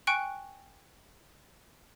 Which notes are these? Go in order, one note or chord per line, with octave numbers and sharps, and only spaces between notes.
G5 G#5 C#6 F#6 C#7 D7